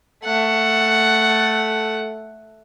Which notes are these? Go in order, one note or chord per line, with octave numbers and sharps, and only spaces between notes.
A3 F#5